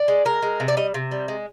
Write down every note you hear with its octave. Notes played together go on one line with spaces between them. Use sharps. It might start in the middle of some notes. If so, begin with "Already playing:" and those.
Already playing: D5
G#3
G#3 A#4
G#3
C3
D5
G3 D#5
C3
G3
G#3